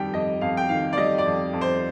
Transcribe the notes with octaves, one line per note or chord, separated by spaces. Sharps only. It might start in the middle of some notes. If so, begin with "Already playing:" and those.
Already playing: F2 D#3 G3 G5
F2 D#5
F2 F5
G5
D#3 F5
D5
G3 D#5
D5
F2
F2
C5